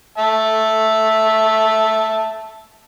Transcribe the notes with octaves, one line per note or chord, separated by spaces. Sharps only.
E5 A5